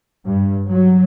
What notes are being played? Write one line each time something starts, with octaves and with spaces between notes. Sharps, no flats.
G2
F#3